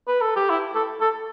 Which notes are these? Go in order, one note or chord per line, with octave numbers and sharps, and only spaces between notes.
B4
A4
G4
E4
A4
A4